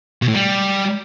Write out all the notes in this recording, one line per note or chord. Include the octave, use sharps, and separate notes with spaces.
B2
A2
G3